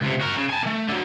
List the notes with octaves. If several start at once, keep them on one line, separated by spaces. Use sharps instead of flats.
C#2 C3
F#4 A#4
C#3
G#5 A5
A3 A#3
D3 F#3